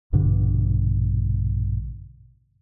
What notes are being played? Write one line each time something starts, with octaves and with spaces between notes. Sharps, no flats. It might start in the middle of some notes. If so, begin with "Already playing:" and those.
A#1 G2 B2 D3